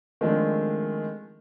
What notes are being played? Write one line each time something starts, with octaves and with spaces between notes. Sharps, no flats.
D#3 F3 G#3 A3 C4 D4